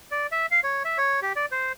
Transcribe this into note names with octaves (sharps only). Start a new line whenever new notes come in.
D5
E5
F5
C#5
E5
C#5
G4
D5
C5